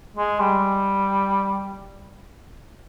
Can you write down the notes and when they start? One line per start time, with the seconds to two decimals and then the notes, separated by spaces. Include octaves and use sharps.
0.16 G#3
0.40 G3